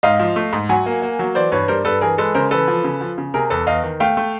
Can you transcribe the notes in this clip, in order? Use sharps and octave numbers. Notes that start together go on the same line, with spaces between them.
G#2 D#5 F5
F3
A3
G#2
F#3 F#5 G#5
A#3
A#3
F#3
E3 C5 D5
G2 B4 C#5
G3 A#4 C5
G2 A4 B4
E3 G#4 A#4
G#3 A4 B4
C#3 A#4 C5
E3 A4 B4
F3
C#3
F3
C#3
C3 G#4 A#4
E2 A4 B4
E2 D#5 F5
D#3
A3 F5 G5
A3